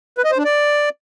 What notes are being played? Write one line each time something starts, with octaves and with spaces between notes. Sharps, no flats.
B4
D#5
C5
D4
D5